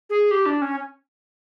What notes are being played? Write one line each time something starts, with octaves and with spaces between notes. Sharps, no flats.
G#4
G4
D4
C#4